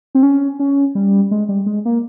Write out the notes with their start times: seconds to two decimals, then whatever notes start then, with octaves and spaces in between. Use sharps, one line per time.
0.15 C4
0.23 C#4
0.59 C#4
0.95 G3
1.31 G#3
1.49 G3
1.66 G#3
1.85 A#3